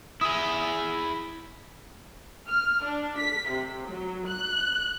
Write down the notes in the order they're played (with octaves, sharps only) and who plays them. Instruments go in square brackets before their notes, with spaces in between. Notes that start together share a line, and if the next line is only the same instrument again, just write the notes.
[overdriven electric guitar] E4 G#4 [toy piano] D#6 E6
[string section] F6
D4
B6
C3
F#3
F#6